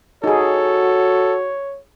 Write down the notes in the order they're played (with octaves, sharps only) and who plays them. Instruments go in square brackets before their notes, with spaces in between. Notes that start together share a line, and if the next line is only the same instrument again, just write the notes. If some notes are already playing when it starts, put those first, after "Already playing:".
[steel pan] D#4 G#4 [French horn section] F#4 [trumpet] A4 [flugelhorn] C#5